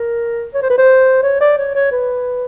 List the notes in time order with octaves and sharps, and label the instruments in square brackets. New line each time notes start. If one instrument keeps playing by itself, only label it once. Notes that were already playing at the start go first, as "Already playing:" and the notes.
Already playing: [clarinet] A#4
C#5
C5
B4
C5
C#5
D5
C#5
C#5
B4